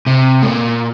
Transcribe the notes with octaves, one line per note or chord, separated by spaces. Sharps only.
C3
A2
A#2